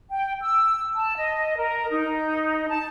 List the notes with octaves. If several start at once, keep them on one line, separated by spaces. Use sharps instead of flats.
G5
E6
A5
D#5
A#4
D#4
A5